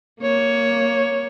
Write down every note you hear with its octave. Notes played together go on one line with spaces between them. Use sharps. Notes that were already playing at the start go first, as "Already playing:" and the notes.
A#3 C#5